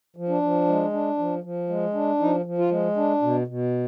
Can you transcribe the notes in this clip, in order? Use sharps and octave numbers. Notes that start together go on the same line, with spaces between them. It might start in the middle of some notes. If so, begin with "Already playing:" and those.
F3
D4
F3
G#3
D4
F3
F3
G#3
D4
F3 D#4
F3
F4
G#3
D4
B2
B2